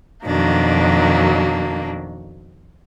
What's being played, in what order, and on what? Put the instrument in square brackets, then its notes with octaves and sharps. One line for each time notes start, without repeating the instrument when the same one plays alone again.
[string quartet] F2 B2 D#3 F#3 A#3 D4